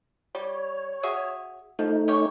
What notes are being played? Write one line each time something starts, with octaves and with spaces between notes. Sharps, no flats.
G3 C#5
F#4 G#4 E5
F3 A3 D#4
C#4 G4 C#5